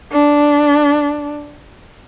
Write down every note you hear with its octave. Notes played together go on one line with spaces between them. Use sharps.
D4